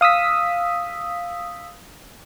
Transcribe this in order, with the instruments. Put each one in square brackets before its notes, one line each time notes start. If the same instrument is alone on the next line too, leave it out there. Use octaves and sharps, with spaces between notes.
[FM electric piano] F5 D#6 E6 B6